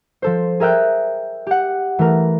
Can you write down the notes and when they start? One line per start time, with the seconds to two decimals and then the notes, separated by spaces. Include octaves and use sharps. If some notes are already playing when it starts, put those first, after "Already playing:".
0.22 F3 A4 C5
0.60 G#4 A#4 E5 G5 F#6
1.47 G4 F#5
1.99 E3 A3 A#4